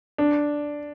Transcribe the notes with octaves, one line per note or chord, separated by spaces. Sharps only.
D4